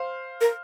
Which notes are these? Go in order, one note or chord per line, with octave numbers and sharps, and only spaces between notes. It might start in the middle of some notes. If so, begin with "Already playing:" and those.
Already playing: C5 F5
A#4